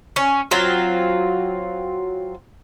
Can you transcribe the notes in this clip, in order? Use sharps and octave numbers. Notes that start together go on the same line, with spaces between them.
C#4
F#3 C4 F4